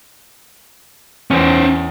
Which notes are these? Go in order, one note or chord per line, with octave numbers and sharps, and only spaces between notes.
E2 C#4 C5